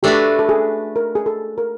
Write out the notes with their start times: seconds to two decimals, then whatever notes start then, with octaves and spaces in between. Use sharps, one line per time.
0.03 A3 D4 F#4 G4 B4
0.39 A4
0.49 G#4
0.96 A#4
1.15 G#4
1.26 A4
1.58 A#4